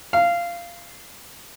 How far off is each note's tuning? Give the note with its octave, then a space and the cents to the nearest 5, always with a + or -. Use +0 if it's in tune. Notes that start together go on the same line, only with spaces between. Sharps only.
F5 -15